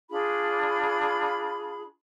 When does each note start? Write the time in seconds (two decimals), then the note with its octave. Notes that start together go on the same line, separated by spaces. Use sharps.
0.11 D4 F4 G#4 B5